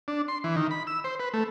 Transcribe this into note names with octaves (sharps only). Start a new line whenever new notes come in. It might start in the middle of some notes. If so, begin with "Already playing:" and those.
D4
C6
E3
D#3
B5
E6
C5
B4
A3